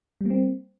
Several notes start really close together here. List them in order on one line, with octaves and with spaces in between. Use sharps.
G3 A#3 C4